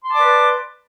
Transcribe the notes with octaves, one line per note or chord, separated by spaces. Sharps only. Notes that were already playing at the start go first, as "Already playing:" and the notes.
B4 D5 A5 C6 D6